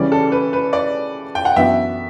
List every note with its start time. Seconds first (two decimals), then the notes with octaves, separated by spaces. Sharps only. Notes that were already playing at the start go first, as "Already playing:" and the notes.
Already playing: C#3 E3 G3 C#4 D5
0.12 A4
0.32 B4
0.53 B4
0.73 D5
1.35 G5
1.45 F#5
1.56 F#2 E3 B3 D4 F#4 E5